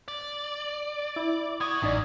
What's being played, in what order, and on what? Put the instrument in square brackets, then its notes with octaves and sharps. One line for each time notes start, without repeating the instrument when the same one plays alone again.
[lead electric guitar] D5
[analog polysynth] E4
[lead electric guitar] B3 F#4 [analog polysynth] D#6 G#6
[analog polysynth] A1 D#4 D5 [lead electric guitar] F#2